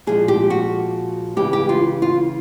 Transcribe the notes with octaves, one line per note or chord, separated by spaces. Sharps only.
A#2 F3 G#3 G#4
G4
F#4
C#3 E3 G#3 G4
G4
F4
F4